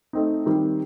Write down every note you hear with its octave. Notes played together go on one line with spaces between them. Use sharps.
A3 C4 D#4
D#3 G3 C4